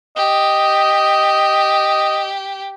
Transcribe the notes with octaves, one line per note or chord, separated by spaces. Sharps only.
G4 D#5